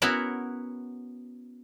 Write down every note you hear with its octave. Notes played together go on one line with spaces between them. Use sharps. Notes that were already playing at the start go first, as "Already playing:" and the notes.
B3 C#4 E4 F#4 A#4